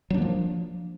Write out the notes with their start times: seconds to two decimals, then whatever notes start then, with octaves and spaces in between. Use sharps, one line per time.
0.10 F#3
0.14 D4
0.18 A#3
0.22 F3